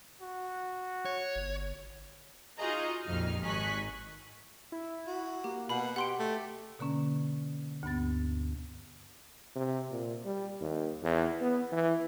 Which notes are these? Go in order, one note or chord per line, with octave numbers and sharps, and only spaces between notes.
F#4
C#5
G1
D#4 F4 F#4 G#4 D#5 A#5
A#1 F2 C3 D#4 F6
G#1 D#4 G#5 C#6 F#6 B6
E4
F#4
A#3 G4
B2 B5 F#7
G4 F#5 C6 D7
A3
B2 D3 A#3 C#4
D2 G2 B3 A6
C3
A#2
G3
D#2
E2
B3
E3